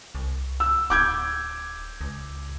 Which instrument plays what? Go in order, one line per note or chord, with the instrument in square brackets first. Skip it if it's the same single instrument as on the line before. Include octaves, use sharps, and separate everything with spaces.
[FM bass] C2
[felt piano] E6
[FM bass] D1 [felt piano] D6 G6 G#6
[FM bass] C#2